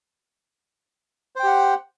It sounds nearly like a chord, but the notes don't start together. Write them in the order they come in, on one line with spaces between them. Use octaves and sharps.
C5 G5 G4 F#5